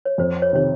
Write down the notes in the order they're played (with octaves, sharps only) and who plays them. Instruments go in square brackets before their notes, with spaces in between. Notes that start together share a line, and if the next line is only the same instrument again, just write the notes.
[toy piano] C#5
[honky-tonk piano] F2 [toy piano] C5
[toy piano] C#5
[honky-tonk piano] C3 D#3 [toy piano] C#5